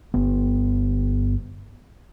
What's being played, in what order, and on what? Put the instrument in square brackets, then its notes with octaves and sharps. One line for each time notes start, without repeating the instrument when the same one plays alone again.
[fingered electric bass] G1 B3